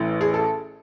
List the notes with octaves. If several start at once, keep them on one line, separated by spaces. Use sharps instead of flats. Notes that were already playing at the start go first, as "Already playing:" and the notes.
Already playing: A1 A2 E3
G#4
A4